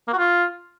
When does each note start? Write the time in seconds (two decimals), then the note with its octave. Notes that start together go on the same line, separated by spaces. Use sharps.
0.08 A#3
0.13 F#4
0.18 F4